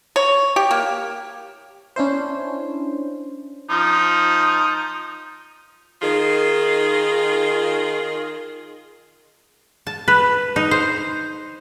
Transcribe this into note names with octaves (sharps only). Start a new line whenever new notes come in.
C#5
G4
A#3
C#4 D4 E4 C5
F3 D#4
D#3 D#4 F4 G#4
A5
B4
D#4
C5